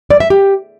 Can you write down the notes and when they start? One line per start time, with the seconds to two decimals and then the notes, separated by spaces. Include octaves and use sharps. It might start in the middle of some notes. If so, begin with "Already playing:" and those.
0.10 D5
0.20 E5
0.30 G4